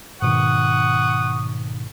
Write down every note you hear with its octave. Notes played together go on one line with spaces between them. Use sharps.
G#2 B2 D#3 F#5 C#6 D#6